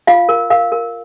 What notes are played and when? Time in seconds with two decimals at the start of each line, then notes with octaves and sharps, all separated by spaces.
0.07 F4 F5
0.29 A#4
0.50 A#4 F5
0.72 A#4